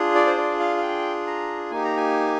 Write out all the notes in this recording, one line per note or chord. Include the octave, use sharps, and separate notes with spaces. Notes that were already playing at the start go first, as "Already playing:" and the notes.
Already playing: D4 F4 G#4
D5
C5
D5
F5
F5
G5
A#5
A#3 D#4 G4 G#5
A#5
G#5